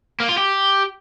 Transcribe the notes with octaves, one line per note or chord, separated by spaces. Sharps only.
A#3
F4
G4